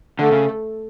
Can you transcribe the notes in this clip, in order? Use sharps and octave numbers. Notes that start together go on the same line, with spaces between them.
D3 A3
C#3